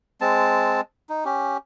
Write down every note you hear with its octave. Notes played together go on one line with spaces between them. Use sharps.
G#3 C4 A5
D#4
C#4 G4